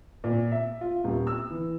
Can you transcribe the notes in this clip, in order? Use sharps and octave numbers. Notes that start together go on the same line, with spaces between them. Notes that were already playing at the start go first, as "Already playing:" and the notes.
A#2
E5
F4
D#1
E6
E3